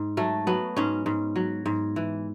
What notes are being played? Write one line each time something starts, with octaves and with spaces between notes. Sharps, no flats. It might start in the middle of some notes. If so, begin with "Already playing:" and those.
Already playing: G#2
F#3 A3
F#3 B3
G#2 C#4
G#2
F#3
G#2
E3